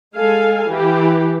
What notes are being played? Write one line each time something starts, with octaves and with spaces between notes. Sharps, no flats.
G#3 A4 F5 G#5
E3 G4